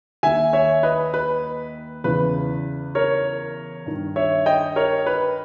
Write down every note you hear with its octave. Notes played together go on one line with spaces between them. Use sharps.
D#2 D#3 E5 G#5
C#5 E5
B4 D#5
B4
E2 C#3 E3 B4
A#4 C#5
G2 D#3
C#5 E5
D#5 G5
A#4 C#5
B4